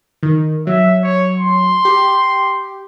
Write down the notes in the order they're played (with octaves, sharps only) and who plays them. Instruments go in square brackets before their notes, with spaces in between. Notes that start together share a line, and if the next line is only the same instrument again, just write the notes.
[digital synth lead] D#3
[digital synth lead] F#3 [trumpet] E5
[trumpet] C#5
C6
[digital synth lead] G4